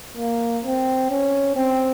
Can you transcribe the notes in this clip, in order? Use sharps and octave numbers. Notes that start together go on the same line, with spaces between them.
A#3
C4
C#4
C4